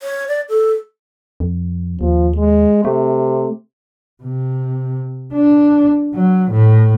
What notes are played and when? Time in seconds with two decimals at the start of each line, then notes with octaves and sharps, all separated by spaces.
0.03 C#5
0.28 D5
0.49 A4
1.40 F2
2.01 D#2 F3
2.36 G#3
2.85 C3 A3
4.23 C3
5.33 D4
6.14 F#3
6.51 A2